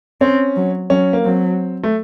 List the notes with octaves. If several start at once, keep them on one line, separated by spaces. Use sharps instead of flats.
C4 C#4
F#3
F#3 C#4
A#3
F#3 C4
A3